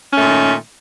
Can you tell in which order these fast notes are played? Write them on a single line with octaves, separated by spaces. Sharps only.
C#4 A3 A#2 D#3